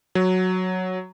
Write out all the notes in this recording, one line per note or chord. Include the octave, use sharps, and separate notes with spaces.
F#3